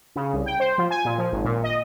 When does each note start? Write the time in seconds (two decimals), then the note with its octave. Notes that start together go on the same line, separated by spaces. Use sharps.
0.16 C#3
0.33 C2
0.46 G5
0.60 C5
0.78 F3
0.91 G#5
1.05 A#2
1.18 F3
1.32 G#1
1.44 A#2
1.63 D#5